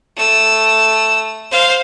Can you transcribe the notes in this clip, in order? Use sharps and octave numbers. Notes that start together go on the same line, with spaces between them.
A3 E6
C5 F5